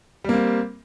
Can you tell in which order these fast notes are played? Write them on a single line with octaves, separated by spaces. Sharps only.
G3 A#3 C4